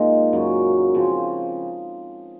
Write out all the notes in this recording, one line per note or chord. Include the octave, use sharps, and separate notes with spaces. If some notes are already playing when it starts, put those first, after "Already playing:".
Already playing: A#2 G#3 D#4
F#2 C#3 F#3
C#3 F3 C4